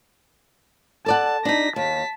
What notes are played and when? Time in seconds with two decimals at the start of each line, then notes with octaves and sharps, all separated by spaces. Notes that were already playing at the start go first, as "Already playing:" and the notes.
1.06 A4 D5 F#5 A5
1.45 D4 D#4 A#6 B6
1.76 D#2 A5 B6